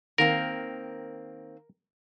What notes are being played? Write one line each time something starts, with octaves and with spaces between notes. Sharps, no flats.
D#3 A#3 C4 A#4